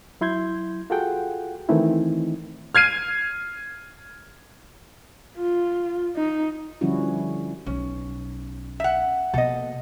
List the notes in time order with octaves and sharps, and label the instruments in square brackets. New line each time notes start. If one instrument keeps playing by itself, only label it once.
[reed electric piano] F#3 E4 C6 G6 G#6
F4 F#4 G#4 A4 F#5 G5
D#3 E3 A3 C4 D#4 E4
[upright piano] F6 G#6 C7 D#7
[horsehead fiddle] F4
D#4
[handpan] D3 F3 G3 C#4 E4 F#4
[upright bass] B1 [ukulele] C#4
[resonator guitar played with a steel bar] E5 F#5
[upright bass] B2 A#3 [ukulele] A4 D#5